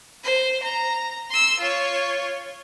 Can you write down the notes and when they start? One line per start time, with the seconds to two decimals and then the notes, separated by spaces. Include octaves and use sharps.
0.24 C5
0.63 A#5
1.30 C6 E6
1.60 F4 C#5